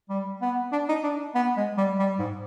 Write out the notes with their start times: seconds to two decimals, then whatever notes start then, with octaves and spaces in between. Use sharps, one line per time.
0.09 G3
0.41 B3
0.72 D4
0.89 D#4
1.03 D4
1.35 B3
1.57 G#3
1.77 G3
1.99 G3
2.19 G#2